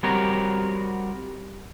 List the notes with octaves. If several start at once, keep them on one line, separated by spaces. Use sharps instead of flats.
G3 C4 F#4 A#4 C#5